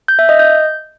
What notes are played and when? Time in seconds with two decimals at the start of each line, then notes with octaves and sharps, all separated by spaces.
0.08 G6
0.19 E5
0.29 D#5
0.39 G6